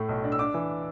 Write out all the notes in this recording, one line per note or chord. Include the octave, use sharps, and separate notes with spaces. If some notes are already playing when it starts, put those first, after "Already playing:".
Already playing: A2 A3
B1
D4
E6
D4 D6
E3